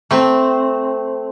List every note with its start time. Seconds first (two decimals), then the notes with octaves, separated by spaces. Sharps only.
0.11 A3 C4